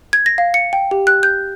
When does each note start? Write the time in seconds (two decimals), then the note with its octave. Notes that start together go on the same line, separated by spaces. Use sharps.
0.13 G#6
0.26 A#6
0.38 F5
0.54 C#7
0.73 G5
0.91 G4
1.07 F#6
1.23 G6